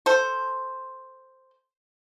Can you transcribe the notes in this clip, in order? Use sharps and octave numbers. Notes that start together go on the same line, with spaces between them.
A4 C5